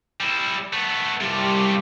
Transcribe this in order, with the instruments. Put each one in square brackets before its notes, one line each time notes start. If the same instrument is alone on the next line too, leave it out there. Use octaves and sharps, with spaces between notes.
[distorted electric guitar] G3 E4
A3 B3
[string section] C2 G4 [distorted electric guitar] A3 F4